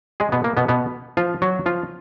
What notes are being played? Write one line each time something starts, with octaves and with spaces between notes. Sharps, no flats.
G#3 G#4
B2 B3
A#3
B2 B3
B2 B3
F3 F4
F#3 F#4
F3 F4